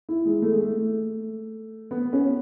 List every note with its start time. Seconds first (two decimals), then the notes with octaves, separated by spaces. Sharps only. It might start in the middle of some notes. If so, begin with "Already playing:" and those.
0.09 E4
0.25 G#3
0.42 A3
0.52 G#3
0.59 A3
1.91 B3
2.13 C#4